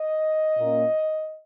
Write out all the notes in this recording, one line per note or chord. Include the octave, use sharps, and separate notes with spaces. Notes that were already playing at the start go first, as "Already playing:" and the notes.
Already playing: D#5
A#2 A#3 C#4